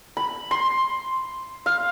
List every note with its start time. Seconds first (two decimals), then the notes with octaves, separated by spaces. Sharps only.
0.17 B5
0.51 C6
1.66 F5